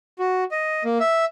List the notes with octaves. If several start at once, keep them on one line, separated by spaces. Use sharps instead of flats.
F#4
D#5
A#3
E5